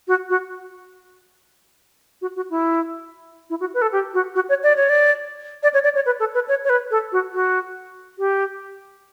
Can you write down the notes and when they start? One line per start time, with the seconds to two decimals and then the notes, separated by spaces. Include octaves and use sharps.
0.08 F#4
0.29 F#4
2.22 F#4
2.36 F#4
2.50 E4
3.50 E4
3.60 F#4
3.74 B4
3.82 A4
3.92 G4
4.14 F#4
4.35 F#4
4.49 C#5
4.63 D5
4.76 C#5
4.89 D5
5.63 D5
5.74 C#5
5.84 D5
5.95 C#5
6.06 B4
6.20 A4
6.34 B4
6.48 C#5
6.64 C#5
6.70 B4
6.91 A4
7.12 F#4
7.33 F#4
8.19 G4